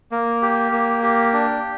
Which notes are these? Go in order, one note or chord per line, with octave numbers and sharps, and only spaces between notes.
A#3
G4
A#3
G4
D4